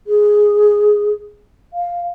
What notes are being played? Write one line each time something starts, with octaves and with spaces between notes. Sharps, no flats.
G#4
F5